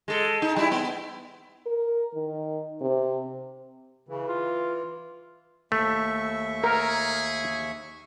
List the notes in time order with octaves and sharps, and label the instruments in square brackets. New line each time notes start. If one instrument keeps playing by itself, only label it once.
[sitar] G#3 A4
D#4
G3 E4
B3
[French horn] A#4
D#3
C3
[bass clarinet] C#3 [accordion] E3
[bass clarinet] F4
[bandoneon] D#2 E5 C#6 [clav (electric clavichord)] A3
[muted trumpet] G#4 [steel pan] A#4